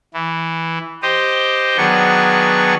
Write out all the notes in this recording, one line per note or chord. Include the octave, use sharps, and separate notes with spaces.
E3
G4 C5 D#5
D#3 F#3 B3 D4 G#4 C#6